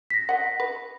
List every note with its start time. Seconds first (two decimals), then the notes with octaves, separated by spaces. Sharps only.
0.10 A#6 B6
0.29 D#5 F#5
0.60 B4